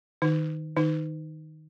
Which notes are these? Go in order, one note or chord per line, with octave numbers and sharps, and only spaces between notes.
D#3 D#4
D#3 D#4